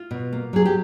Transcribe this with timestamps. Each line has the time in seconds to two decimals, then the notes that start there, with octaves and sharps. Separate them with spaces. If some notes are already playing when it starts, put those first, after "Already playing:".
Already playing: F4
0.11 B2
0.33 A#3
0.53 F#3 G#4
0.66 G4